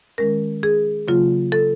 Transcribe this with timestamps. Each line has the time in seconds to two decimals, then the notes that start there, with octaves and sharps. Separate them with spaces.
0.18 D#3 G#3 C#4 A#4
0.63 G#4
1.08 C#3 F#3 A#3 F4
1.52 A4